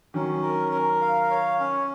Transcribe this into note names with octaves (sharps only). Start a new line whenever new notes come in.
D#3 F#3 C#4
A#4
A#4
F5
C#5
C#4